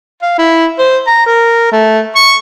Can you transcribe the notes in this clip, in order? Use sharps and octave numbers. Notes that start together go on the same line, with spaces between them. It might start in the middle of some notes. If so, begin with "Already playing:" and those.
F5
E4
C5
A#5
A#4
A3
C#6